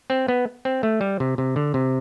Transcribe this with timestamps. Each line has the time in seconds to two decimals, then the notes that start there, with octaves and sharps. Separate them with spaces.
0.10 C4
0.28 B3
0.65 C4
0.83 A3
1.01 G3
1.20 C3
1.38 C3
1.56 D3
1.74 C3